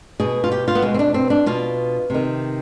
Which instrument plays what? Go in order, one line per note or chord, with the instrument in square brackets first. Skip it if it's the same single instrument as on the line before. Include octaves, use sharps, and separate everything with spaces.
[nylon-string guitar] B2 G#4
F4
G4
F4
B3
B2 G#3
C4
D4
C4
D4
B2 F4
C3 D#3